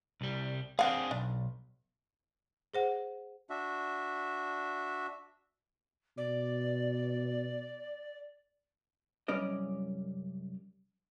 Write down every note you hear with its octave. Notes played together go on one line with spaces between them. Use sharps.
C2 G3
C4 D4 G#4 F5 F#5
B1 D4
G#4 C5 F#5
D4 F#4 E5
B2 D5
C2 F#2 G3 C#4 D5 D#5